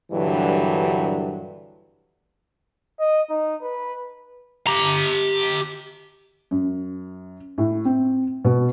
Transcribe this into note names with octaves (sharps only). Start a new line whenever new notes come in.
G2 A#2 D3 E3 F#3 G3
D#5
D#4
B4
G4 A#5
F#2
A2
C4
B2